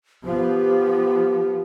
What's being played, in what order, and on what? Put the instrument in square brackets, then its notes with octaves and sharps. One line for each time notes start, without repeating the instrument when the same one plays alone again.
[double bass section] F3 B3 [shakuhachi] G4